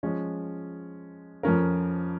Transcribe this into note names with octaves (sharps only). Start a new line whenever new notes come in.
F3 G#3 C#4
F2 F3 C#4 A#4